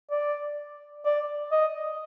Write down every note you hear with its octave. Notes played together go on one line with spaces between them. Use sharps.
D5
D5
D#5